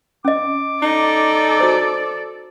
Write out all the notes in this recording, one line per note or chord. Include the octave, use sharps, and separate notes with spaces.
C#4 D#5 D6
D#4 A4 D5
F#4 C5